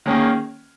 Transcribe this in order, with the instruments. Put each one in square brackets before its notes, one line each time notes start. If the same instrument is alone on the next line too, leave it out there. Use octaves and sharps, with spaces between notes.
[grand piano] D#3 A#3 C#4 G#4